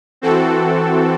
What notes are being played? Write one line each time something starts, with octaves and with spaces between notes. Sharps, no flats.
E3 C4 F#4 A4